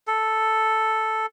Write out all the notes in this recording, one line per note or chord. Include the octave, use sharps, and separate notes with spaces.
A4